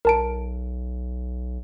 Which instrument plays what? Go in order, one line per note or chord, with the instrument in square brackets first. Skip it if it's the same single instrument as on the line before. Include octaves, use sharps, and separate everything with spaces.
[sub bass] B1 [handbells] A#4 A5 D7